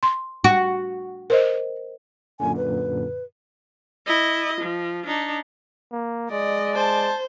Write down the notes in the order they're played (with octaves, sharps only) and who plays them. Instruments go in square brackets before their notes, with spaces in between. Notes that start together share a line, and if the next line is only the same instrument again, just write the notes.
[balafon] C6
[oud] F#4
[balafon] A#4 C5 D#5
[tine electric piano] F#2 A#2 D3 [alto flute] G#5
[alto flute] B4
[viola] E4 D#5
F3
D4 D#4
[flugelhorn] A#3
[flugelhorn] G#3 [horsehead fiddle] D5 [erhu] D#5
[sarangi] C5 [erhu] A5